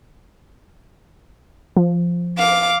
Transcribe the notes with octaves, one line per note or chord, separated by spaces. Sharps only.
F3
F5 D6